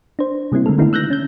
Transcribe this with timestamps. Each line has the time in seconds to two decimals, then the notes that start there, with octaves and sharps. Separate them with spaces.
0.19 D4 C5
0.52 C3 G3 A#3 C4 E4
0.66 D3 G#3 A3 A4
0.78 D3 D#3 A3 B3 D4 E4
0.93 E6 F#6 G6 A#6
1.10 C#4 G6